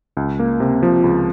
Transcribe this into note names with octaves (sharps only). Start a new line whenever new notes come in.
C#2
A#3
C3
F3
C#2